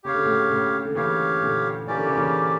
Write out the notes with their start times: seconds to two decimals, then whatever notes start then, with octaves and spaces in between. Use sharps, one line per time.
0.04 C#3 G4 C#5 F5
0.14 D3
0.23 A2 C#3
0.50 A2 C#3
0.85 D3
0.95 C#3 E3 G4 C#5 F5
1.41 A#2 D3
1.87 E3 A#3 C#4 G4 D5
1.97 D3
2.06 C#3 E3
2.17 C#3 E3